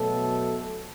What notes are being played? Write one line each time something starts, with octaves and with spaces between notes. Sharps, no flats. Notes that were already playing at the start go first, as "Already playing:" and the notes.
Already playing: B2 F#3 A3 A4